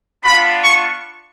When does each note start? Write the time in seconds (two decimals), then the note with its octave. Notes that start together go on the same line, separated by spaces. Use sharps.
0.23 B3 D4 F4 B5
0.63 C#6